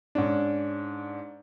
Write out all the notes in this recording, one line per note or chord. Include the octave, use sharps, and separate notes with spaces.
G#2 C#4 D4